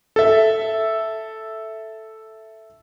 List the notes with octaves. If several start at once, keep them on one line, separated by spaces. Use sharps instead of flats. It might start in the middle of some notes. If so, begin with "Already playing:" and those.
A4 E5